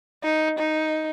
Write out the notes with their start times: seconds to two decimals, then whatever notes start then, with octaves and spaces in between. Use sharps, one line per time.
0.24 D#4
0.59 D#4